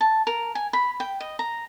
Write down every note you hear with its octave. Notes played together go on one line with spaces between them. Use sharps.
A5
A#4
G#5
B5
G5
D#5
A#5